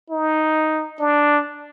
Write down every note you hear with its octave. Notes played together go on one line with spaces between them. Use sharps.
D#4
D4